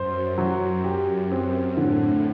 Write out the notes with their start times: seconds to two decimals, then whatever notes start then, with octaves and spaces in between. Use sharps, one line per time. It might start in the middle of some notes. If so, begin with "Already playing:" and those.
Already playing: F#2 C5
0.38 F#3
0.84 G4
1.31 C4
1.77 A2 D3